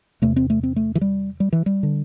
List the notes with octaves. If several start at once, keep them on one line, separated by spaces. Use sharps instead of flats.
E2 C3 A3
C4
A3
C4
A3
E3
G3
G3
E3
G3
D3